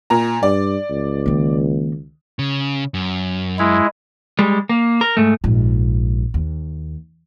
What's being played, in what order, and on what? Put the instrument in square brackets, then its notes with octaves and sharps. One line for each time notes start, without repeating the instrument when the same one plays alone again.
[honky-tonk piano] A#2 A#5
[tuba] G2 [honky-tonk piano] D5
[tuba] C#2
[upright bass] D#3 A#3
[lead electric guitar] C#3
F#2
[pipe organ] G#3 E4
[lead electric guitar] G3 G#3
A#3
A#4
G#2 A3
[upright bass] A#1 G#2
D#2